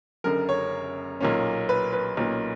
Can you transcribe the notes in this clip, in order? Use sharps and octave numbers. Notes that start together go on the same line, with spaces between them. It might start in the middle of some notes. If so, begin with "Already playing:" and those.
F#1 F#2 D3 A#4
C#5
B1 A#2 A#3 C#4
B4
B4
B1 A#2 A#3 C#4